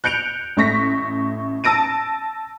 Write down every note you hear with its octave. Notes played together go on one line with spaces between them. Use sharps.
F#6 G6 C#7 D7 F7
A1 A3 C#6 A#6 B6
A5 E6 A#6 D7 D#7